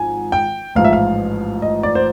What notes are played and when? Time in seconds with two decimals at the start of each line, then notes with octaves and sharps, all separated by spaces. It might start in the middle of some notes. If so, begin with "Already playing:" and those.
Already playing: G#1 G#2 F3 G#5
0.32 G5
0.75 A1 G#2 F3 F5
0.84 E5
0.93 F5
1.62 D#5
1.83 D5
1.95 C5